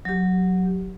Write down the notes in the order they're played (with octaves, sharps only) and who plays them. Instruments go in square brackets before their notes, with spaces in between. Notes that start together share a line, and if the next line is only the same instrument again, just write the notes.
[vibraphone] F#3 G4